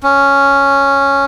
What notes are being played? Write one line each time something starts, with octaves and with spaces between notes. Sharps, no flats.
C#4